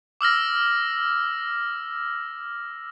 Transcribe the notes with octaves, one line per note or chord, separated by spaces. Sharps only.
D6 E6 F6 A#6